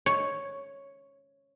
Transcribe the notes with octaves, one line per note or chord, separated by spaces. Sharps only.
C#5